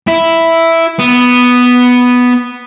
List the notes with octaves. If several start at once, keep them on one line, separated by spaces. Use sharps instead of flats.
E4
B3